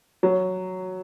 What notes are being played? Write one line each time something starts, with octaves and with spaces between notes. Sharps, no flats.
F#3